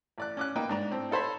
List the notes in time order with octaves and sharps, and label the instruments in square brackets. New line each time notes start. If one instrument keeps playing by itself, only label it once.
[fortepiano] A1 D5 F#6
C#4 D6 F#6
A#3 B3 D#4 B4 G5
G#2 D4 A#5
A2 C4
D#4 A4 C5 C#5 B5